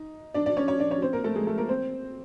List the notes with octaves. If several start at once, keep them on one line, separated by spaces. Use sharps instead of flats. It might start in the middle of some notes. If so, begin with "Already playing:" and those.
Already playing: D#4
D4 D5
D4 D5
C#4 C#5
C#4 C#5
D4 D5
C#4 C#5
C4 C5
A#3 A#4
A3 A4
G#3 G#4
A3 A4
A#3 A#4
C4 C5